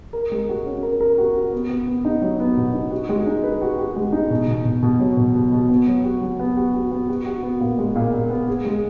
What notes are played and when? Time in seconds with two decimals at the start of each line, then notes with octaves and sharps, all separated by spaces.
0.13 A#4
0.31 G#3
0.49 F#4
0.66 C#4
0.83 A#4
1.01 A#4
1.18 F#4
1.36 F#4
1.52 B3
1.69 B3
1.87 B3
2.05 D#4
2.22 F#3
2.40 B3
2.57 B2
2.74 D#4
2.91 F#4
3.09 G#3
3.27 D#4
3.43 B4
3.62 F#4
3.78 F#4
3.96 G#3
4.12 D#4
4.30 B2
4.48 B2
4.65 B2
4.83 B2
4.99 F#3
5.17 B2
5.35 B2
5.52 B2
5.69 B3
5.87 F#3
6.04 F#4
6.21 F#3
6.39 B3
6.57 F#4
6.74 F#4
6.92 B3
7.09 F#4
7.26 F#4
7.43 B3
7.60 A#2
7.78 G#3
7.95 A#2
8.13 A#2
8.30 B3
8.48 G#4
8.65 G#3